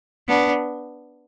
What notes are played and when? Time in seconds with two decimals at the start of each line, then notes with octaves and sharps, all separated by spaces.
0.29 B3 D4